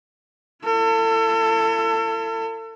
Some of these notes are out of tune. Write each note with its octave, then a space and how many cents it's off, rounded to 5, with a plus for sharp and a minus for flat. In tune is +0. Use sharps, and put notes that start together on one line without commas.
E4 +45 A4 +35